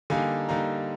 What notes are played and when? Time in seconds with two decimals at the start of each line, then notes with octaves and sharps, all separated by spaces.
0.10 D3 G3 A#3 D#4 F5 G#5
0.49 D3 G3 A#3 D#4